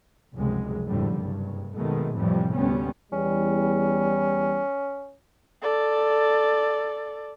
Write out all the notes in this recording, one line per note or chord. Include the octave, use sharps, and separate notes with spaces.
F1 C#2 F#2 C3 G#3
G#1 F2 A2 D3 G3
F#1 C2 G2
G#1 F#2 B2 D#3 G#3 A3
F2 A2 C3 E3 F3 G3
D2 G3 B3 C#4
E2 G3 C#4
A4 D5